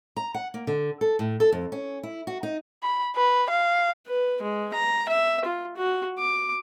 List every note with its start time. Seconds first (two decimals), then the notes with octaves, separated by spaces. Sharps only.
0.17 A#5
0.34 F#5
0.54 A#3
0.67 D3
1.01 A4
1.19 A2
1.40 A4
1.52 F2
1.72 C#4
2.03 E4
2.27 F#4
2.43 D#4
2.83 B5
3.16 B4
3.50 F5
4.07 B4
4.42 G#3
4.74 A#5
5.08 E5
5.45 F4
5.76 F#4
6.19 D6